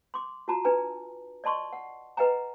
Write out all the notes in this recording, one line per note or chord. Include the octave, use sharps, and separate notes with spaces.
C6 D6
F4 F#4 A5 A#5
D4 B4 G#5 A#5
D5 D#5 A5 C6 C#6
F#5
B4 D#5 F#5 G#5 A#5